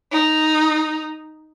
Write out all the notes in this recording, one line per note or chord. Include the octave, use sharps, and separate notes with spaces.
D#4